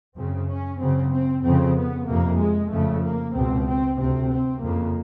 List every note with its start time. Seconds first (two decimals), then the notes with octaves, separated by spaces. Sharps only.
0.16 F#2 C#3 C4
0.48 C#4
0.79 F#2 C#3 C4
1.11 C4
1.43 F2 C#3 C4
1.76 B3
2.07 F2 C3 A#3
2.38 G#3
2.71 F2 C#3 A3
3.03 A#3
3.34 C#2 B2 C4
3.67 C4
3.99 D2 C3 C4
4.30 C4
4.62 F2 C#3 A#3